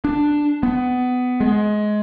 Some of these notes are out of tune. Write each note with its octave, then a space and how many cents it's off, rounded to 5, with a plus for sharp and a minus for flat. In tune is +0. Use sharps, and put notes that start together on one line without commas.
D4 +5
B3 +20
G#3 +20